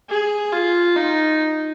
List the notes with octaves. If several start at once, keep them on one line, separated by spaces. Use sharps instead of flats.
G#4
F4
D#4